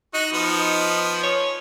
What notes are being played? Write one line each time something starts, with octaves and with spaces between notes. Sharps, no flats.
D#4 F#4
F3 B3
C#5